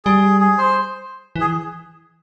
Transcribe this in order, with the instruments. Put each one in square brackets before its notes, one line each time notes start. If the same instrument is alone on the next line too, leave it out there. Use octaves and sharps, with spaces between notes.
[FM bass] G3 [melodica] G#4
[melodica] G#4
C5
[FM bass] E3
[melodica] G#4